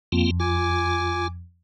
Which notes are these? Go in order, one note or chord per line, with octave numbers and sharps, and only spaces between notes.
F2 A#3 C4 F4
F4 G#5 D6